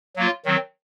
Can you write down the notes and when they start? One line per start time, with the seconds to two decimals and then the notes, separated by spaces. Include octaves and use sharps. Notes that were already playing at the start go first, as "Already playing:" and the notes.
0.16 F#3 A#3 F4
0.45 D#3 F#3 C4